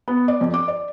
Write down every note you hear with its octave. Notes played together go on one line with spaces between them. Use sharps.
B3
D5
F2
D6
D5